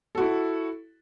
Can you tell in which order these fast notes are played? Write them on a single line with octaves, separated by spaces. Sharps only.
A4 F#4 E4